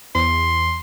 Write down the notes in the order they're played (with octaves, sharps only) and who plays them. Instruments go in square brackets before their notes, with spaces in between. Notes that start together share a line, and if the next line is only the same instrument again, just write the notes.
[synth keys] E2 [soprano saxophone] C6